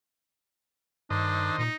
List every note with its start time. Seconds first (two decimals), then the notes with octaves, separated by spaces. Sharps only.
1.10 G2 D#3 D4 C5 D#5
1.58 A#2 D#4